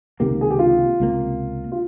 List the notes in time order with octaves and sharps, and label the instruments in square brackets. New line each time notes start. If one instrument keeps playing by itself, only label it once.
[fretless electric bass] C#2 C3 D#3 A#3 [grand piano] G4
[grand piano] G#4
G4
F4
[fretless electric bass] C#2 C3 D#3 A#3
[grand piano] F4